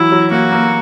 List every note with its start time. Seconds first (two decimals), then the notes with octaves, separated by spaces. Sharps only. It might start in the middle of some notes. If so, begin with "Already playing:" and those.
Already playing: E3 F#3 E4
0.12 F#3
0.31 A#3 F#4
0.52 A#3